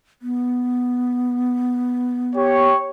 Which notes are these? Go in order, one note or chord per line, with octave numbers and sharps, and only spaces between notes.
B3
G4 C#5